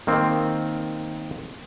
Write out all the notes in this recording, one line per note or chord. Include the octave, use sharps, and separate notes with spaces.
D#3 A#3 C4